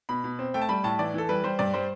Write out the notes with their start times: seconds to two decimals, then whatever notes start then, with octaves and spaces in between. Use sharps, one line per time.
0.09 B2 B5
0.24 B2
0.39 C4
0.54 A3 G5
0.62 A5
0.69 G3 B5
0.84 A2 A5
0.99 E3 D5
1.14 E3 A4
1.29 G3 B4
1.44 G3 C5
1.59 G2 D5
1.74 G3 C5